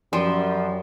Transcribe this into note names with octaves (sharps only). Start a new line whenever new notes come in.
F#2 F3 G3 C6